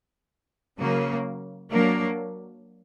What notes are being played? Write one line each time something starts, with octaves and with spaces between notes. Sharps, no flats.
C#3 F#3 A#3
F#3 A#3 D4